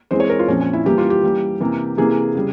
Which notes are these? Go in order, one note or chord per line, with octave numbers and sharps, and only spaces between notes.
E3 G#3 C4 C5
C#5
A#4
F4
A#2 F3 C4 C#4
C#4
E4
E3 G3 A#3 G4
F4
G4
E3 G3 A#3
C3 E3 A#3
C3 E3 A#3 G#4
C#3 G3